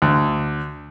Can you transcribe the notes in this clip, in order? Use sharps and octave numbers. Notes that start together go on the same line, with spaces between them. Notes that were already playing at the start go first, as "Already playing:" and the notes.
D2